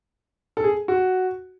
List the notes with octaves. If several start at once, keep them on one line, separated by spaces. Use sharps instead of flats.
A4
G#4
F#4